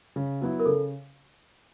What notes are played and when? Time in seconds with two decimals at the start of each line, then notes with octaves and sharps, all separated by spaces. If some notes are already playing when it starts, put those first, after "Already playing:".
0.16 C#3
0.41 F#3 B3 E4
0.60 A#4
0.66 C#3 A4